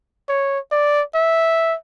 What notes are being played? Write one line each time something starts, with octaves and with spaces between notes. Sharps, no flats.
C#5
D5
E5